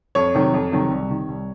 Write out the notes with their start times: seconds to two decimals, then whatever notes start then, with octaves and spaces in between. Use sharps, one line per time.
0.15 F2 C#5
0.35 C3 D#3 F#3
0.54 F2
0.72 C3 D#3 F#3
0.90 C2
1.09 C3 D#3
1.28 C2